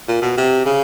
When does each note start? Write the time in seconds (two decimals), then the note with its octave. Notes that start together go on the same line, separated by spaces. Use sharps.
0.08 A#2
0.22 B2
0.37 C3
0.66 C#3